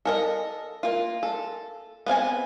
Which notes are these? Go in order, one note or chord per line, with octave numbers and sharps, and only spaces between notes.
A4 A#4 D#5
A#3 F4
A4
B3 C4 F5 G#5